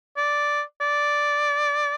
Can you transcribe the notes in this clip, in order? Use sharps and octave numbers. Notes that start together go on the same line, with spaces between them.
D5
D5